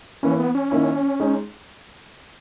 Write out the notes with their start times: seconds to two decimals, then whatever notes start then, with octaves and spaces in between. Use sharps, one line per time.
0.23 E3 A#3 C#4 E4
0.40 B3
0.55 C#4
0.71 D#3 A#3 E4
1.20 G#3 D#4 G#4